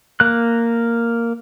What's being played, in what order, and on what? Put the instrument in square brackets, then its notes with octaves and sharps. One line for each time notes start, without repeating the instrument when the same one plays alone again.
[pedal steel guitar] A#3 F#6